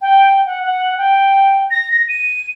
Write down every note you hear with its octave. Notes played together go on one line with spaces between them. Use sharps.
G5
F#5
F#5
G5
A#6
A#6
D#7